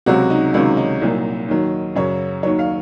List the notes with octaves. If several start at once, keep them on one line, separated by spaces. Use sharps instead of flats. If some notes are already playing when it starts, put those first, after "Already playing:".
C#2 C3 F#3 F#4
D#4
C#2 C3 D#3 F#3 C#4
D#4
C2 A#2 F#3
D#2 D#3 F#3
F#2 C#3 F#3 C#5
D#2 D#3 F#3 C#5
F5